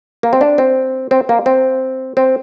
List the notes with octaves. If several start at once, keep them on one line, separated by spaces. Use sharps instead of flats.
A#3
C4
D4
C4
C4
A#3
C4
C4